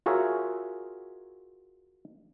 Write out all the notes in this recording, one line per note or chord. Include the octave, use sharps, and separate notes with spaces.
F4 F#4 G#4 A#4 C#5 E5